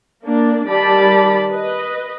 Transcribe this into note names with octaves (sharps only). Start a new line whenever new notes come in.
A#3 D4
D#3 G3 G4 D5 A5 B5
B4 D#5